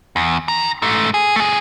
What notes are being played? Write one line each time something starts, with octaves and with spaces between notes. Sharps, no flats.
E2
D#3 A#5
G#2 A3
G#4
A3 G#4